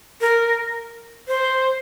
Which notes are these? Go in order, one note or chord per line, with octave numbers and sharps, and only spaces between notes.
A#4
C5